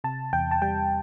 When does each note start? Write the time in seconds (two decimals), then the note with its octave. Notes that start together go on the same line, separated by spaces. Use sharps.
0.04 C3 A5
0.33 E2 G5
0.51 A5
0.62 G3 G5